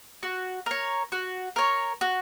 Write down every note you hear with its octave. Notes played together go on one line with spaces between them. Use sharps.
F#4
A#4 C#5
F#4
A#4 C#5
F#4